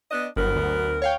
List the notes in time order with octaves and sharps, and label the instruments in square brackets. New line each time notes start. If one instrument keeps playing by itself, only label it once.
[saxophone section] B3 D4 D#5
[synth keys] G1 [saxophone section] F#3 B3 A#4
[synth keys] D2
C#5 F5 G5